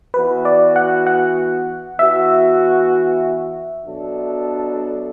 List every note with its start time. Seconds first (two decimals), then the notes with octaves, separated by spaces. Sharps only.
0.14 E3 B3 F#4 B4
0.45 D5
0.76 F#5
1.07 F#5
1.99 E3 B3 F#4 E5
3.84 B2 F#3 D4 F#4 A4